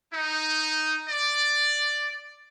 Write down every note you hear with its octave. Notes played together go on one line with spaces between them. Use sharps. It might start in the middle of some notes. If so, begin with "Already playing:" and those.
D#4
D5